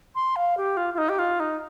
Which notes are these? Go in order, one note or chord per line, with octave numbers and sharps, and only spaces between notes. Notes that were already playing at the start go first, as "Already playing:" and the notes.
C6
F5
G4
F4
F4
D#4
G4
F4
D#4